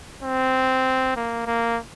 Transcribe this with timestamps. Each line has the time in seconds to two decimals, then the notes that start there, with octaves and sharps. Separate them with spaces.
0.22 C4
1.16 A#3
1.46 A#3